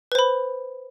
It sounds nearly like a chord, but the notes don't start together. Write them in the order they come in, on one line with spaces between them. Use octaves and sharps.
B4 C5 B5